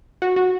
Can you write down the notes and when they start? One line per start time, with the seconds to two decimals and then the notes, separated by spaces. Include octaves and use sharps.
0.22 F#4
0.36 F#4